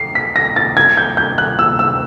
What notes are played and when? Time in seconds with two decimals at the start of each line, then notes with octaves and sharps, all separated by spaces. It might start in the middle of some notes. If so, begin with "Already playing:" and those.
Already playing: C7
0.15 B6
0.36 A#6
0.56 A6
0.77 G#6
0.97 G6
1.17 G6
1.38 F#6
1.59 E6
1.79 E6